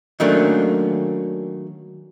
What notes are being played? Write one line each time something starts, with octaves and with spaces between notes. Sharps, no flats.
D#3 F#3 A3 A#3 C#4 D4